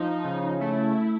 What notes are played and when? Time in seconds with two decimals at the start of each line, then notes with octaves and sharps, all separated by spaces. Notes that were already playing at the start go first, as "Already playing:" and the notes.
Already playing: F3 D#4
0.24 C#3
0.61 A3 E4